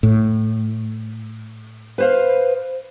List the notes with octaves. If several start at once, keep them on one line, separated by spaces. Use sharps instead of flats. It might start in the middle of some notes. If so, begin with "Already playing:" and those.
A2
B4 C5 F5